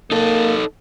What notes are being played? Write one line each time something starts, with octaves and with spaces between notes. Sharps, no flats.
A#3 D#4 A4